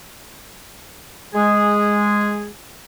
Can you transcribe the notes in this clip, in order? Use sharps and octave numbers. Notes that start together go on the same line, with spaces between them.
G#3 G#4